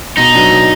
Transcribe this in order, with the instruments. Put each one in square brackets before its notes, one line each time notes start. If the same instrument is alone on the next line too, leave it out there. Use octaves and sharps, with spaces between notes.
[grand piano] B2 [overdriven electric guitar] D#4
[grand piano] F#3 B3 D4
B2